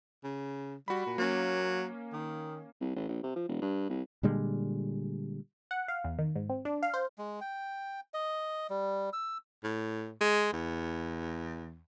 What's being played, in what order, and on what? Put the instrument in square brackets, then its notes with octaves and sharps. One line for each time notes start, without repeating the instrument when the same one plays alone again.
[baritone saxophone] C#3
[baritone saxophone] G3 [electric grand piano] F#4 B5
[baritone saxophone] A#2
[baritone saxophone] F#3 [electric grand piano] A#3 C#4
[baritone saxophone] D#3
[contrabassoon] C2
A1
A#1
C3
F3
E1
G2
C2
[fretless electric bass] A#2 D3 G3 G#3
[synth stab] F#5
F5
E2
D#3
G#2
C4
D4
F5
C5
[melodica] G#3
G5
D#5
G3
E6
[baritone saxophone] A2
G#3
E2